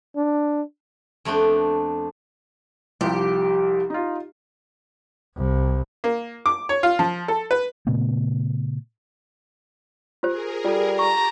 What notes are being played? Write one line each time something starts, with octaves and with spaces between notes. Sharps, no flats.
D4
F2 A3 B3 D4 G5
C2 F3 G4
D#4 F4
C2
A#3
D6
C#5
F4
F3
A4
B4
A#2 C#3 A3 B3
F4 G4 G#4 A#4 C5
G3 F4 A4
G4 A5 A#5 C#6